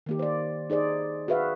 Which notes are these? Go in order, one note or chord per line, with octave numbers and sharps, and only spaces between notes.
D#3 A#3 G4
C5 D5
D#4 G#4 C5 D5
F#4 G#4 B4 E5 F5